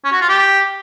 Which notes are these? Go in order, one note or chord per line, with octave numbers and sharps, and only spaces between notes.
C#4
F#4
F4
G4